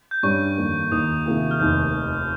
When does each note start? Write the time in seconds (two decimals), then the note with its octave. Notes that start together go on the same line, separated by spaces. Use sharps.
0.11 G6
0.23 G2 G3 C#4 C#6
0.57 F2 D#3 A#3
0.91 D#2 D#3 A#3 D#4 A#4 D#6
1.26 C3 D#3 A#3 F4 G#4
1.51 F6
1.60 F1 D#2 D#3 G6